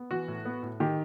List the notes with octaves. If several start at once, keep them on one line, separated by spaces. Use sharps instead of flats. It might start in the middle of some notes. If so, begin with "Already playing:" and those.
Already playing: B3
E3 F#4
A2
B3
A2
D#3 G4